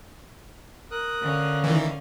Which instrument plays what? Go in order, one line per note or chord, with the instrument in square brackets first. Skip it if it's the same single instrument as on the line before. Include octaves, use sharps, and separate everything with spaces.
[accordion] A#4 D#6 F#6
[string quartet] D3 C#4 F5
[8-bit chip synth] D#3 E3